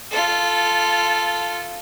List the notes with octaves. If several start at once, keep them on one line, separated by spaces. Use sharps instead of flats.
F4 A4